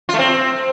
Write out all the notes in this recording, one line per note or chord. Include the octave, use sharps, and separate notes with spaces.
F4
A3
C4